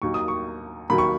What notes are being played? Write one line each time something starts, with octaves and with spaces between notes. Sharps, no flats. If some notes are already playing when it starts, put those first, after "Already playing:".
D#2 D#3 F#3 C#6
D#6
C#6
D#2 D#3 F#3 B5
C#6